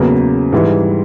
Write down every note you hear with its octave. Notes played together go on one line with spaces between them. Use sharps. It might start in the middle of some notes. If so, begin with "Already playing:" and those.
Already playing: E2 C#3 F#3 A#3
G#2 E3 G3